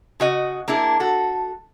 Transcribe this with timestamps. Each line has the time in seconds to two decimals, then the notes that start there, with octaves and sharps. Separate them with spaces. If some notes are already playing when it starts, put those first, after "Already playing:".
0.20 C#3 F#4 D#5
0.68 A#3 D4 E4 G#4
1.00 F#4 A4